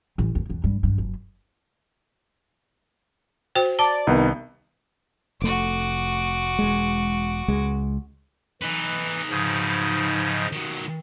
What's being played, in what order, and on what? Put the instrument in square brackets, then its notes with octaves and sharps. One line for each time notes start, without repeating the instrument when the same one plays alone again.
[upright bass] A1
D#2
E2
G2
G2
F#1
[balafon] F#4 C5 G5
[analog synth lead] D5 [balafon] A5
[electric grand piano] C2 D#3 B3 [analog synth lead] D#4
[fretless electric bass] F1 A3 [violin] F#4 D6
[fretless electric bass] E1 G#3
C#2 G#3
[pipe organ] E3 [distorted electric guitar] D#4 B4
[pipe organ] G#2 C#3 F3
[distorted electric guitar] D#3 F#3